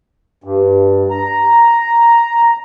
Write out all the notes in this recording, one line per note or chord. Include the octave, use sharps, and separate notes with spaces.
G2
A#5